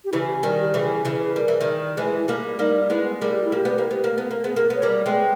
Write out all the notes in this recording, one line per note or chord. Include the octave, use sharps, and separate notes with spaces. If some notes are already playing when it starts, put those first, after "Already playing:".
G4
C#3 E3 E4
G4
D#3 G3 G4
G4
C#3 E3 G#4
C#3 E3
G#4
G3 A#4
E3
D#3 G3
E3 G#3 G#4
E4
G3 A#3
G3 A#3 D#4
G#3 B3 E4
G3 A#3 G#4
G4
E4
A#3 G4
B3
A#3
B3
A#3
B3
A#3
B3 G#4
A#3
B3
C#5
G3 A#3
G#3 B3 G5